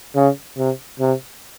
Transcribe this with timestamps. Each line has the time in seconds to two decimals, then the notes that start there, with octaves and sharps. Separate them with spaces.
0.15 C#3
0.58 C3
1.00 C3